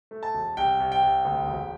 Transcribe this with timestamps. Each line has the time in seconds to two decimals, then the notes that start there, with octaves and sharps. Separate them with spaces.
0.11 A3
0.23 A5
0.35 E1
0.57 C2 G5
0.80 C2
0.92 G5
1.03 C2
1.25 D2
1.48 E1